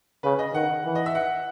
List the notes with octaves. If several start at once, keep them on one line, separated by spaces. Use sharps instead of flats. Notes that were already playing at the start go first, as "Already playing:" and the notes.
C#3 B4
D#5
D#3 F#5
E3
D#5
E5
F#5